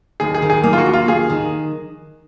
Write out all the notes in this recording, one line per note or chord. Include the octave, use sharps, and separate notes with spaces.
D#2 G#4
G#4
D#3
G#4
A#3 G#4
F4
F#4
D#2
F4
D#2 G#4
D#3